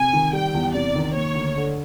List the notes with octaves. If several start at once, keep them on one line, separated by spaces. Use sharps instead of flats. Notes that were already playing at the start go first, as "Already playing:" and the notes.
Already playing: C3 G#5
D#3
G3 G5
E2
C3 D5
D#3
A#3 C#5
D2
D3